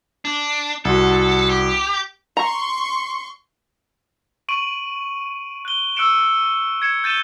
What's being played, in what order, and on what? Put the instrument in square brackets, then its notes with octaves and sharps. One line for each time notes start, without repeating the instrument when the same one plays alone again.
[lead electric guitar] D4
[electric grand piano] C2 F#4 [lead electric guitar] A4
[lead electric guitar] G4
[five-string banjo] A#5 [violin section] C6 C#6
[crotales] C#6 D7 D#7 F#7
F#6 D#7 G7
C#6 E6 F#6 C#7 D7 E7
G#6 C#7 E7
G6 A6 D#7 E7 G7